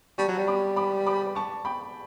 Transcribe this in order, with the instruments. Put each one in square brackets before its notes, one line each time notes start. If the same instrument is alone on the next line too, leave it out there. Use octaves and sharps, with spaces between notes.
[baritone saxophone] G3 [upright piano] A5 C#6
[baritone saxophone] F#3
G3
[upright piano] B5 D6
B5 D6
B5 D6
A5 C#6
G5 B5